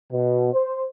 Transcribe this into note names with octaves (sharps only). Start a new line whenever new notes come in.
B2
C5